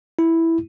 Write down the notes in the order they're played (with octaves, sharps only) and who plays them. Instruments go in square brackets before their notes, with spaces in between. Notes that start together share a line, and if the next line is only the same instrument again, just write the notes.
[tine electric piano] E4